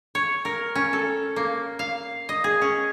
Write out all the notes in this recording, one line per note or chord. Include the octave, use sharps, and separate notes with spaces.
C#5
A#4
C#4
A4
A#3
F5
D#5
G#4
C#4